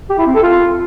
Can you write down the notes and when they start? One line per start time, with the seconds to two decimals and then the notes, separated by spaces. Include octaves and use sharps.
0.10 G4
0.18 E4
0.26 C4
0.35 A4
0.43 F4